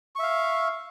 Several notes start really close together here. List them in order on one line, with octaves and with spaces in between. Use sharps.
C#6 E5 F5